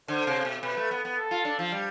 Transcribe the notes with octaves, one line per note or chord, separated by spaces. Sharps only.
D3 C5
C3
B2
B2 B4
A3
B3
B3
A4
F4
D4
F3
G3